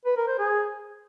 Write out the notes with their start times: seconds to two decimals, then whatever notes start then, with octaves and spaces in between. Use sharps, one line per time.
0.05 B4
0.16 A#4
0.28 C5
0.39 G#4